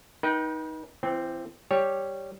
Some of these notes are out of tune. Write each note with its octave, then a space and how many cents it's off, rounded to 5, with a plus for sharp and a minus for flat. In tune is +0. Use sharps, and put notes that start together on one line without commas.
D#4 +10 B4 -40 G5 -15
E3 +35 C4 +0 G5 +0
G3 +0 G4 +0 C#5 +0